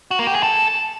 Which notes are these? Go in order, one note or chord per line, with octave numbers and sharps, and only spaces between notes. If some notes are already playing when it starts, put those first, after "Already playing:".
F#4
A#3
G4
G#4
A4